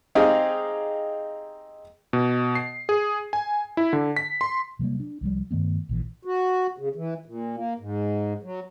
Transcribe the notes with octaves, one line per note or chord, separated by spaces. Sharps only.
C4 D#4 G4 G#4 F5
B2
C7
G#4
G#5
E4
D3
B6
C6
C3 F#3 G3 A#3
D4
C2 F3 G3
G2 D#3 A3 B3
A#1 A#2 E3
F#4
C#3
E3
A#2
A#3
G#2
F#3